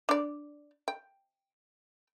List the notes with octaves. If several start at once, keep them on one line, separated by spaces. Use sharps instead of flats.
D4 D5
G5